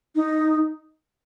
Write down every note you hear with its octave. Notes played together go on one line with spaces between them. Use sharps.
D#4